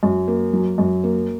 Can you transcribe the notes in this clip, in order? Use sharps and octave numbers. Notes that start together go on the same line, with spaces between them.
F#2
A#3
F#3
F#2
A#3